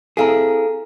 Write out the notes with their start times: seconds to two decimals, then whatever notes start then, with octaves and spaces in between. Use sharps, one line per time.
0.17 C4 E4 G#4 A4 F5 A#5